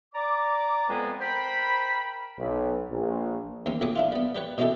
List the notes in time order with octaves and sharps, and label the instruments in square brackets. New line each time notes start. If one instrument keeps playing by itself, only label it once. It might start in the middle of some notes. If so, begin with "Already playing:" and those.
[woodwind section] D5 A#5 D6
F2 G#3 B3 C4 B4 G#5
A#4 C5 G5 B5
[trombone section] B1
A#1
[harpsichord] D#2 C4 C#4
A#1 F2 C4 C#5 D6 D#6
D4 E4 F4
G3 B3
G3 G4 B4 C#5
B2 G#3 C#4 E4 G4 A4